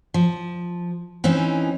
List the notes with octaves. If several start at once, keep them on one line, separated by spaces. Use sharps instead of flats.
F3
E3 C4 C#4 D#4